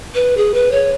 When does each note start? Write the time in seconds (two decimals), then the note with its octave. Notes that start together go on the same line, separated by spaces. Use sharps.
0.15 B4
0.37 G#4
0.54 B4
0.72 C#5